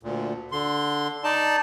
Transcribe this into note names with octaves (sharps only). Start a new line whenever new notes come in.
D2 A#2
D3 C6
D#4 D5 A5